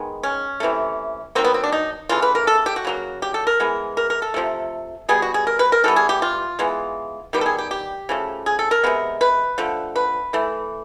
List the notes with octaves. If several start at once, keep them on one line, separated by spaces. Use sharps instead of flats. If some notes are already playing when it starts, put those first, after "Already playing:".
Already playing: D#3 G#3 B3
C#4
C3 E3 A3
D#3 F#3 A#3 C4
B3
C4
D4
D#4
C#3 E3 A3 F4
B4
A#4
A4
G4
F#4
C#3 F#3 A#3
G4
A4
A#4
E3 G#3 B3
A#4
A#4
A4
C3 F3 A3
B2 G3 B3 G#4
F#4
G#4
A#4
B4
A#4
E3 G3 B3 A4
G#4
G4
F4
E3 G#3 B3
D#3 G3 B3 G4
A4
G#4
G4
G4
C#3 F3 A3
G#4
A4
A#4
C3 D#3 G#3 B3
B4
D3 F3 A3
B4
E3 A3